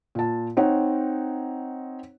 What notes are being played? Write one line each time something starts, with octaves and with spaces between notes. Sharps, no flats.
A#2 A5
C4 D#4 C#5 F#5